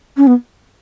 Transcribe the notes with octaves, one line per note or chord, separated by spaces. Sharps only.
C#4
B3